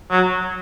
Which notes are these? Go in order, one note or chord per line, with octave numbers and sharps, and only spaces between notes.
F#3